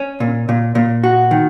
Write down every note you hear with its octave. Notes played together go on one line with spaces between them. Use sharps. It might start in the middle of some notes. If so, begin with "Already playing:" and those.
Already playing: C#4
A#2
A#2
A#2
F#4
D#3